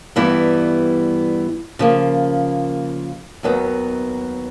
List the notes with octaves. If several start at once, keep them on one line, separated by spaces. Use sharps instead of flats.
G2 E3 G3 B3 E4
C#3 F3 A#3
D#2 D#3 F#3 B3